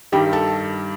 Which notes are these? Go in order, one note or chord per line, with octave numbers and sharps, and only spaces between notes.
G2 D#3 G3 G4 G5
A4 A5